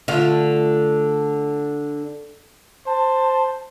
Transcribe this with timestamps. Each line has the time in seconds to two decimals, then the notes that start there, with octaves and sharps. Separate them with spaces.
0.08 D3 A3 F4
2.87 C5 A5